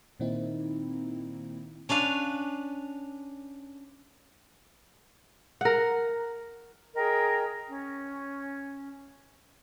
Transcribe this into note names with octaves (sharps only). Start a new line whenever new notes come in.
A#2 D#3 A#3 C4 D#4 E4
C#4 D4 B4 F5
A#4 F#5
G#4 A#4 D#5 G5
C#4